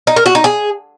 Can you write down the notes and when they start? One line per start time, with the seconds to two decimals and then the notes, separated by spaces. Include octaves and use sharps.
0.07 D#4
0.16 A#4
0.26 F#4
0.35 D#4
0.44 G#4